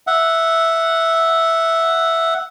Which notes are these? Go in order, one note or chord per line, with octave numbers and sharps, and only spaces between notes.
E5 F#5